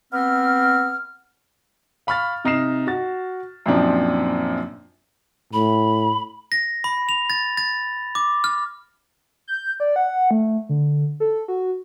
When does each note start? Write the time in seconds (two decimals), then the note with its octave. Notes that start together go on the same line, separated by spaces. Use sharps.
0.13 B3 C4 F6
2.07 F5 B5 C#6 F6 A6
2.45 C3 D#4 F6 C7 E7
2.87 F#4 A6
3.66 F#2 A#2 F3 C4 D4 D#4
5.53 A2 B5
6.52 A#6
6.84 B5
7.09 F7
7.30 A6
7.57 A6
8.15 D6
8.44 F6
9.48 G6
9.80 D5
9.96 F#5
10.31 A3
10.69 D3
11.20 A4
11.48 F#4